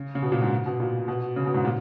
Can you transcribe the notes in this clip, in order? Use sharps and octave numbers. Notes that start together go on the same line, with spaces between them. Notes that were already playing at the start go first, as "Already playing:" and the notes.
Already playing: C#3
C#3
B2
A#2
G#2
B2
A#2
B2
C#3
B2
G#2
A#2